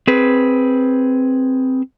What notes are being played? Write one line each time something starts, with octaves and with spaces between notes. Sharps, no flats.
C4 G#4 B4